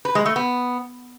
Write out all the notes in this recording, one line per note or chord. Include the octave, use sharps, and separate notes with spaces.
B4
G#3
A3
B3